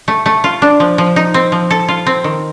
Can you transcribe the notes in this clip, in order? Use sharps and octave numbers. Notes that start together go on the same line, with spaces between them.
A3
A3
F4
D4
F3
F3
D#4
C4
F3
A4
F4
C4
D#3